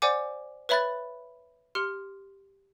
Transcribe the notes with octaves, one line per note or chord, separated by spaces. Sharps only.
C5 D5 F#5 G#5 D6
B4 C#5 E5 B5 F#6 A6
G4 C6 F6 C#7